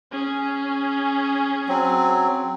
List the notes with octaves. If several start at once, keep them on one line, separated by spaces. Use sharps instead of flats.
C#4 G#4
F#3 C4